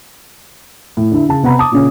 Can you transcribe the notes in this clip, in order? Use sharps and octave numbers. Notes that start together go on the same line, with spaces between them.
A2
D3 E4
C#3 A5
C3 B3 F#5 A#5 B5
A5 D6 D#6
A#2 C#3 C#4